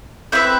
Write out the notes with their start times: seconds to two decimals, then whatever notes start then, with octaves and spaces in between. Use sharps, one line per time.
0.32 C4 E4 B4 E5